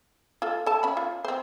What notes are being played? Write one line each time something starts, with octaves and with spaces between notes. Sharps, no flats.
F4 A4
A4 A5
C#4 B5
F4
C4 C5